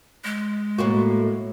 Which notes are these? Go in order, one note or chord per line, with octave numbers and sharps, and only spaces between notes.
G#3
A2 A#3 F#4